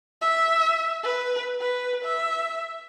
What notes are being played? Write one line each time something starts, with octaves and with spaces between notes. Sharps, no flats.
E5
B4
B4
E5